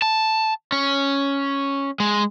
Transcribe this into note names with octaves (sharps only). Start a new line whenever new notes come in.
A5
C#4
G#3